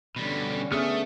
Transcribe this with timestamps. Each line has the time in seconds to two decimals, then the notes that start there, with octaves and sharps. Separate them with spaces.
0.16 B2 D3 G3 C#4
0.72 A3 B3 G#4 E5 D#6 F6